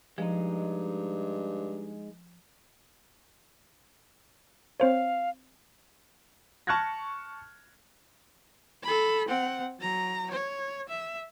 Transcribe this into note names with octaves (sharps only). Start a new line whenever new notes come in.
G2 F3 G#3 D#4
C4 C5 C#5 F5
A5 C#6 F6 F#6 G#6 A#6
A4 B5
C4 F#5
F#3 A#5
C#5
E5